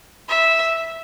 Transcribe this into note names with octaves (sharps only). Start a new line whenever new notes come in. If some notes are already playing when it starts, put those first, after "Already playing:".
E5